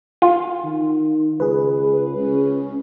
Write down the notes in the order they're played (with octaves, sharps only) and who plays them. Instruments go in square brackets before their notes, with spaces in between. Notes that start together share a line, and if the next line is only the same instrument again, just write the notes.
[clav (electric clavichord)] F4
[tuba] D#3
[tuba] C#2 [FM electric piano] G#4 B4
[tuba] C#2 [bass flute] C#4